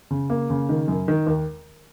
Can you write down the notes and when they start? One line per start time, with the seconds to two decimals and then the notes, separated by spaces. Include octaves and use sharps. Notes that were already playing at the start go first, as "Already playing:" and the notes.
0.11 C#3
0.30 A#3
0.50 C#3
0.69 D#3
0.88 F#2
1.08 D#3
1.27 D#2